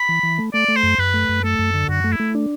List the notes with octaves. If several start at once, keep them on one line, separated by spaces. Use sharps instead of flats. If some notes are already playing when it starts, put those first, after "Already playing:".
Already playing: B5
E3
E3
A3
A3 D5
A3
C5
F#2
F#2 B4
A3
F#2
A3 A4
F#2
D3
F#2 F#4
A3
E4
A3
D4